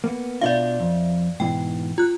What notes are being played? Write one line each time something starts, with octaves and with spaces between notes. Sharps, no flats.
A#3 B3
B2 D4 F4 D5 E5 F5
F2
G#2 B2 E3 G5
F4 F#6